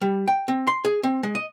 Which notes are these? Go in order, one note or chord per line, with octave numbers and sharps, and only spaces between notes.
G3
G5
C4
C6
G#4
C4
G#3
D#5